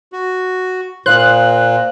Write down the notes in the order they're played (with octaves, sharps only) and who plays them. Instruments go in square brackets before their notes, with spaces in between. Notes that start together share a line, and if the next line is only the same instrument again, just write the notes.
[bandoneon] F#4
[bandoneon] A#2 [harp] C5 F5 D#6 [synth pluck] F#6